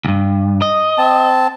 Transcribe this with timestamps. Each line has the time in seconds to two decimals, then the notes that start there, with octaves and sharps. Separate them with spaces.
0.05 D2 G2
0.62 D#5
0.98 C4 A5